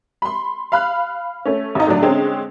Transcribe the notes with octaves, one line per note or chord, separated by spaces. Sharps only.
B5 C6
F5 B5 F#6
A3 C#4
G#1 D#4
A2 D3 F#3 D4
D3 G#3 C4 C#4